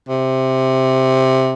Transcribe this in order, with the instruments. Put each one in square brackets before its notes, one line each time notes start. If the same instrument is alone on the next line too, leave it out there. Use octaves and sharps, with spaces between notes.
[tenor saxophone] C3